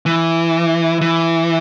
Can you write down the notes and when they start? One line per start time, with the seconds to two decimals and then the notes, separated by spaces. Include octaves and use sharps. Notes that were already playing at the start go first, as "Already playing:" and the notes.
0.06 E3
1.01 E3